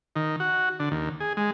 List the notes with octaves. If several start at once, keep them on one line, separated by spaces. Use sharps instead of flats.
D#3
F#4
D3
D#2
G#4
G#3